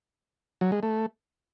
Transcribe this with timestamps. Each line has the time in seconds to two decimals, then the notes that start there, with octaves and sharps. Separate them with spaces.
0.61 F#3
0.72 G#3
0.83 A3